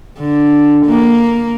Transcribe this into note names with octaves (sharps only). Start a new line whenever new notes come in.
D3
A#3